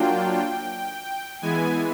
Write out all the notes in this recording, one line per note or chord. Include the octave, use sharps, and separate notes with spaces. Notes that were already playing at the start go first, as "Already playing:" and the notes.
Already playing: F#3 A#3 D4 F4 G5
E3 G#3 B3 E4 G#5